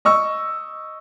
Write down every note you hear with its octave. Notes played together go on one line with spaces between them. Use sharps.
D#5 C#6 E6